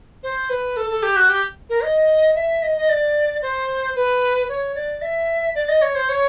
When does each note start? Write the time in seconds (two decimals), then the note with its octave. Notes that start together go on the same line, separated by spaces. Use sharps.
0.23 C5
0.49 B4
0.76 A4
0.90 A4
1.03 G4
1.16 F#4
1.29 G4
1.69 A#4
1.83 D#5
2.35 E5
2.62 D#5
2.77 D#5
2.89 D5
3.42 C5
3.95 B4
4.49 C#5
4.75 D5
5.02 E5
5.55 D5
5.69 D#5
5.82 C#5
5.95 C5
6.09 C#5